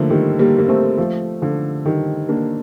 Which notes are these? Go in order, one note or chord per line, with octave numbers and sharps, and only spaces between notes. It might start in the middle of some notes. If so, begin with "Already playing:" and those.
Already playing: D3 F3 A3 A#3
D#3 G3
G3 A#3
A#3
A3 C4
F3 A3
D3 F3
D#3 G3
A#3 D4